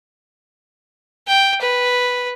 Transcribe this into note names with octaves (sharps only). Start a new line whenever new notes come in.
G5
B4